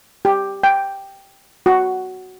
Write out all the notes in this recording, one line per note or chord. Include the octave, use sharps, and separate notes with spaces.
G4
G5
F#4